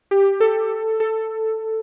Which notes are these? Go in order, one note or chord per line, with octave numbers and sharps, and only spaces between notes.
G4
A4
A4